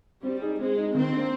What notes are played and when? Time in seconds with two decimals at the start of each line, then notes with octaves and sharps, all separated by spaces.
0.23 G3 C4
0.41 D#4 G#4
0.58 G#3 C4
0.76 D#4 G#4
0.94 D#3 C4
1.13 A#3 D4